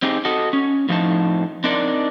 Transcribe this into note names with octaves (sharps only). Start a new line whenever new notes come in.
C4 D#4 G4 G#4
F#4 A4 D#5
C#4
A2 F3 C4 D#4 A5
C4 D4 D#4 A#4 D5